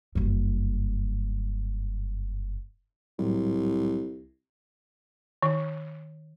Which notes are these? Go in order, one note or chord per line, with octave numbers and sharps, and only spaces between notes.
F#1 G2
C2 A2 F#3 G3
D#3